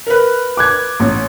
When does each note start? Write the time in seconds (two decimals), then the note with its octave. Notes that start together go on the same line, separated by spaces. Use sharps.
0.07 A#4 B4
0.57 D6 F#6 G#6
1.00 A1